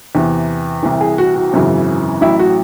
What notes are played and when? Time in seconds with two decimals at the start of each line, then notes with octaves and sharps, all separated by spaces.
0.15 E2 C3 E3
0.83 C2 C3 E3
1.00 G#4
1.18 F#4
1.36 F#4
1.53 G#1 F#2 C#3 E3
2.21 A1 A2 F#3 E4
2.39 F#4